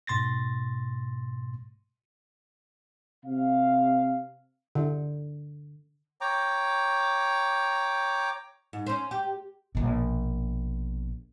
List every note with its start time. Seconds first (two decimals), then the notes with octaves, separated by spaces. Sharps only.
0.07 G#2 B2 C6 A6 A#6
3.25 C3 F5
4.75 D3
6.21 C#5 G5 A#5 D6
8.73 G#2
8.86 C#4 C5
9.11 G4
9.75 A#1 B2